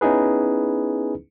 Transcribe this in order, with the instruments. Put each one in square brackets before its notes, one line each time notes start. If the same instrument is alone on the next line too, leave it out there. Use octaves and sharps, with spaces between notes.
[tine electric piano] B3 C#4 D#4 E4 G#4 B4